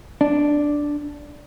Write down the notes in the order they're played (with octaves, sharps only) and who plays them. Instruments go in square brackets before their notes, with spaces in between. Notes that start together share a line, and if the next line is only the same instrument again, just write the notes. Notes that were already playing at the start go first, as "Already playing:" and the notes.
[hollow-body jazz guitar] D4